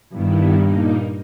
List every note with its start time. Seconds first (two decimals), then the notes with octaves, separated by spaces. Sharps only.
0.12 G2 D#3 G3 B3 E4
0.54 A#2 A#3 D#4